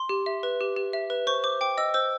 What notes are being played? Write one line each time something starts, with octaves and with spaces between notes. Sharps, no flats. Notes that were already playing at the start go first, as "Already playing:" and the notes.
Already playing: C6
G4
E5
B4
G4
G4
E5
B4
C5 C#6
C5 D6
G5 D6
D#5 E6
C5 E6